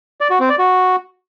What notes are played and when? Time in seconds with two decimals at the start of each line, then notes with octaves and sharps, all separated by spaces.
0.21 D5
0.30 F#4
0.40 C4
0.49 D5
0.59 F#4